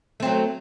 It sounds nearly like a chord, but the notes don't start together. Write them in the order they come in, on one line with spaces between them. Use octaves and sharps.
A3 C4 F#3